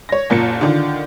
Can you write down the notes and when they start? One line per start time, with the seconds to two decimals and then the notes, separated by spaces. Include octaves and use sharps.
0.09 C#5 A#6
0.30 F#1 A#2 C#7
0.61 D3 D#3 F4